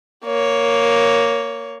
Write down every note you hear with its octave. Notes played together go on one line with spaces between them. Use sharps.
A#3 C#5